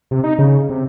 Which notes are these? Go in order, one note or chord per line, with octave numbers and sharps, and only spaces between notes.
C3
D#4
C#3
C3